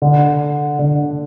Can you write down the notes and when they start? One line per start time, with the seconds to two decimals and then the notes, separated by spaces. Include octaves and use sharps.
0.02 D3
0.79 D3